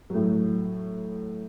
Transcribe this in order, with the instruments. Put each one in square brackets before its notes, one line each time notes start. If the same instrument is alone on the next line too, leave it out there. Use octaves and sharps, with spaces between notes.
[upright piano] A2 F#3